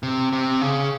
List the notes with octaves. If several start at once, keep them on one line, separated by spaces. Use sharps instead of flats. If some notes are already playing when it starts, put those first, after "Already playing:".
C3
C3
C#3